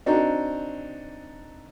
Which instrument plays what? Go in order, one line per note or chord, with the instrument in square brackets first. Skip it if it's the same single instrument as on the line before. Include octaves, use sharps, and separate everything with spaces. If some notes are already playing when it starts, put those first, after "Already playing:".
[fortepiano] C4 D4 D#4 F#4